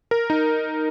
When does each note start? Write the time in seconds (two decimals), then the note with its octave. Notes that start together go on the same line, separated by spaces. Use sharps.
0.11 A#4
0.30 D#4